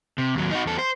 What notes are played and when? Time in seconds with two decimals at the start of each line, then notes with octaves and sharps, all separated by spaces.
0.18 C3
0.35 D#2 F#3
0.51 D#4 F#4
0.66 E2 A4
0.78 C5